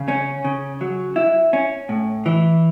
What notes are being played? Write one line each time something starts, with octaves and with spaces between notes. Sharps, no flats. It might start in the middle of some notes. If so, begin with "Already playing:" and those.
Already playing: C#3
C#4
C#3
F#3
E4
C#4
A2
E3